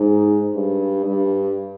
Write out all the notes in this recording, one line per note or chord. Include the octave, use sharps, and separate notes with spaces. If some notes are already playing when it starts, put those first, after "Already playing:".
Already playing: G#2
G2
G2